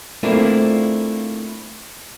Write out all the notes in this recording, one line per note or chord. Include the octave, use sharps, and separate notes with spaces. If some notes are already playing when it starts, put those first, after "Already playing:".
A3 A#3 C4 D4 E4 F4